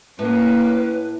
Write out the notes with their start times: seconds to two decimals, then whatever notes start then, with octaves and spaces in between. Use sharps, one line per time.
0.19 A2 A#3 C#4 B4